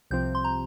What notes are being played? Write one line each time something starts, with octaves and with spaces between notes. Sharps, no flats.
C2 C3 F3 C4 G6
C6
A#5